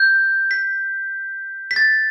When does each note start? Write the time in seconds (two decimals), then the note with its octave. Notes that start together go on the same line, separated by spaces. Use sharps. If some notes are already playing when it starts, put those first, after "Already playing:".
Already playing: G6
0.51 B6
1.71 B6
1.76 A6